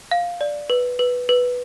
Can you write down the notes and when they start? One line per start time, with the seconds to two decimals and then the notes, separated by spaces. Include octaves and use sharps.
0.11 F5
0.41 D5
0.70 B4
0.99 B4
1.29 B4